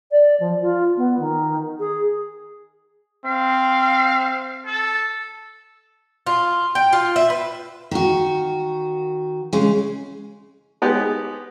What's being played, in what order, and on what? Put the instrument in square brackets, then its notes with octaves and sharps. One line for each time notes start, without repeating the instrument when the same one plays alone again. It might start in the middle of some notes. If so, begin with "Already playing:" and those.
[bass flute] D5
F3
F4
B3
D#3
G#4
[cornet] C4 [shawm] F5
[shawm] A4
[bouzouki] F4
G5
F4
E5
B4
[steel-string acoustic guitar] D#3 F#4
C#3 G#3
[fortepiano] G#3 B3 D#4 G4